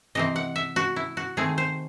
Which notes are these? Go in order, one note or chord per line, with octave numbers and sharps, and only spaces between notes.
C3 E3 C4 D#5
F#5
E5
F#4
E4
F#4
D#3 A3 C4 G#4
C5